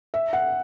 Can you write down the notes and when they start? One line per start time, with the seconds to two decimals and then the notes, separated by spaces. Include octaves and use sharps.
0.14 E5
0.33 F#5